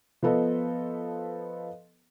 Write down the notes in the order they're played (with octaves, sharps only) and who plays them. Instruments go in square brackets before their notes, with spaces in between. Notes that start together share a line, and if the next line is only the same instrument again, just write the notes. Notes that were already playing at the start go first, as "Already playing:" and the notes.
[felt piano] F3 B3 A4 B4 D#5